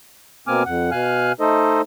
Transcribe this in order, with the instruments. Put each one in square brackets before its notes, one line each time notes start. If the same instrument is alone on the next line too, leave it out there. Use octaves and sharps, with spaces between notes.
[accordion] B2 A#3 C4 G#5 D6 F6
F2 F#5
B2 F5 G#5 F6 F#6
A3 D#4 A4 C5 D#5